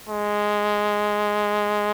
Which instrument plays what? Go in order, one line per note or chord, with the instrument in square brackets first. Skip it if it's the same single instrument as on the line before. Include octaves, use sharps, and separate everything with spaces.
[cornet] G#3